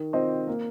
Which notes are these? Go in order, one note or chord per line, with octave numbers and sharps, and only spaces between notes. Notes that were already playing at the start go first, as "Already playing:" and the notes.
Already playing: D#3
C4 F4 C5 D#5
A#3